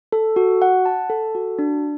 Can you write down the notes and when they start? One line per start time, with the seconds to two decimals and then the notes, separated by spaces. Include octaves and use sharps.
0.12 A4
0.36 F#4
0.62 F#5
0.86 A5
1.10 A4
1.35 F#4
1.59 D4